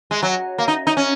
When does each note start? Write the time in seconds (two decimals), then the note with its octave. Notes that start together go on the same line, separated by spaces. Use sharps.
0.11 G#3
0.23 F#3
0.58 A#3
0.68 D#4
0.87 D#4
0.97 C#4